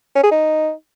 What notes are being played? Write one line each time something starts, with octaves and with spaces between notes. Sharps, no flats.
C#4
G#4
D#4